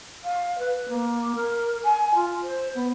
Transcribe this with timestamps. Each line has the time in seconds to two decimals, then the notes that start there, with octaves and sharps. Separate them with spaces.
0.23 F5
0.58 B4
0.88 A#3
1.35 A#4
1.84 G#5
2.14 F4
2.42 C5
2.75 B3